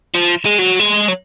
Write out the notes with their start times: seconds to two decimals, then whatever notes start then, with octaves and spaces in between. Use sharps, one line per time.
0.14 F3
0.45 G#3
0.59 F#3
0.79 G#3
1.08 F#3